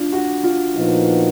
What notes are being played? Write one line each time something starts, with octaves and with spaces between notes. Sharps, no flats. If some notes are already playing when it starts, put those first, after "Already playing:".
Already playing: D4 F4
F#4
F4
A#2 F3 B3 D#4 F#4